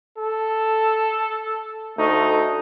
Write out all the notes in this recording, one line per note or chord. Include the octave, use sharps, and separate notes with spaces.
A4
D2 A3 D#4